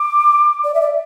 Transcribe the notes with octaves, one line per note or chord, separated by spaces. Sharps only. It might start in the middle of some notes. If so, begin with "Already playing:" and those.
Already playing: D6
D5
E5
D5